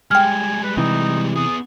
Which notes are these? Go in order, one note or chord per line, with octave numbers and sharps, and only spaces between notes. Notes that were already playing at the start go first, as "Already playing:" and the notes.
G3 G#3 G5 G#5 F6
B4
C3 E3 D#4
B3 G#4 D#6